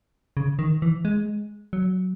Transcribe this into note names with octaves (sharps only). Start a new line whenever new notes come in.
C#3
D#3
E3
G#3
F#3